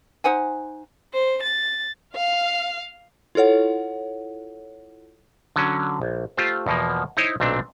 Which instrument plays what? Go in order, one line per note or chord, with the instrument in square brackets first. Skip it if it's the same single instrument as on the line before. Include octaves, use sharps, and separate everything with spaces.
[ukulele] D#4 C5 F#5 G#5
[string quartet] C5
A6
[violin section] F5
[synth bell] E4 F4 A4 C#5 F#5
[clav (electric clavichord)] D3 F#3 C#4
A#1
A3 F4 G4 C5
E2 B2 F3 A#3
D#4 E4 C5 C#5 D#5
B1 A#2 A3 C4 D4